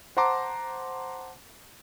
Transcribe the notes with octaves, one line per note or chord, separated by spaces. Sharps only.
C5 F#5 A5 A#5 C6 D6